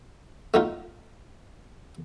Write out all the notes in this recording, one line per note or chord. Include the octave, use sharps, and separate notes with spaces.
A3 D#4 F4